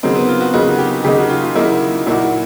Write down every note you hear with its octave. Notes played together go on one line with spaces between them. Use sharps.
C#3 F#3 A#3 C4 D#4
B3
F4
F#4
C#3 F#3 A#3 D#4 F#4
G4
C#3 F#3 A#3 D#4 G4
F#4
F4
F4
C#3 F#3 A#3 D#4 E4
A#2 F#3 A#3 D#4 E4 F#4